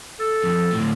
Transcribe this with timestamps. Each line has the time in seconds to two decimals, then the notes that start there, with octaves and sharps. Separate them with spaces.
0.20 A4
0.43 F2
0.72 D2 A2